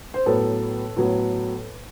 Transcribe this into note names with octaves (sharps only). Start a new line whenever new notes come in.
C5
A2 F#3 B3 A4 B4
A2 F#3 B3